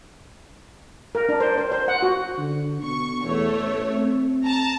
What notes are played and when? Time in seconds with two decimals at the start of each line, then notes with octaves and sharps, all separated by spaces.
1.15 A#4
1.29 D4
1.40 C5
1.58 C5
1.72 C5
1.88 F#5
2.03 F#4
2.38 D3
2.82 B2 C#6
3.24 E2 A3 C#5
3.61 A1
3.92 C4
4.44 A5 A#5